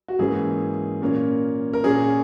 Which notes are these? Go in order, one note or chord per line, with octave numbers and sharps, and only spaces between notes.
F#4
G#2 E3 A#3 C#4 G#4
A#2 A#3 C#4
A#4
A#2 A#3 C#4 G#4